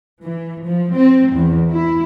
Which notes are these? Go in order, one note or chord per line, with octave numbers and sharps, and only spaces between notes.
E3
F3
C4
E2
E4